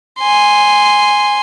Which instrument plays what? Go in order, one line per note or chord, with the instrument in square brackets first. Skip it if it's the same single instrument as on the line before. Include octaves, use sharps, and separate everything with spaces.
[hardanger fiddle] G#5 C6